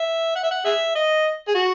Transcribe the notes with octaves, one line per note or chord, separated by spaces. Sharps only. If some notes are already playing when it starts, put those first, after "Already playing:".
Already playing: E5
F#5
E5
F#5
G#4 E5
D#5
G#4
F#4